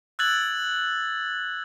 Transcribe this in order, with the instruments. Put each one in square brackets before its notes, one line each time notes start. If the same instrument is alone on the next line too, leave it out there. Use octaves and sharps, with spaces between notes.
[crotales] E6 F#6 G#6 A6 F#7